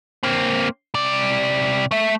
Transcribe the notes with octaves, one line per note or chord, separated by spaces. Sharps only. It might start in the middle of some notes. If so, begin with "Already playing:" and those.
A#3 C4
C3 D5
A3 E5